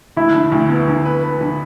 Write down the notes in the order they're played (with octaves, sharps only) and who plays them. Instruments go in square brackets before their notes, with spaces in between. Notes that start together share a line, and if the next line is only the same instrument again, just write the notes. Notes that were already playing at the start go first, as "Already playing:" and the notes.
[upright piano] D2 [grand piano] E4
[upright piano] D3
D2
B3
D3
B4
B4
D3